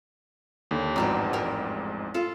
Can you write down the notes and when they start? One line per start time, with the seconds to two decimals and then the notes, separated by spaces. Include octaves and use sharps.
0.71 D#2 D3
0.96 A1 F2 G#2 B2 G3 D#4
1.33 G3 A#4
2.14 F4 A4